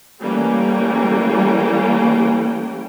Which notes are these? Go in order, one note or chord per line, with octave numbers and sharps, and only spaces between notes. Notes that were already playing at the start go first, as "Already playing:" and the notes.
E3 G3 A3 A#3 C#4 G5